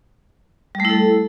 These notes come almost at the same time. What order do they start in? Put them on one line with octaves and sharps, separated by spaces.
G3 A3 E4 A4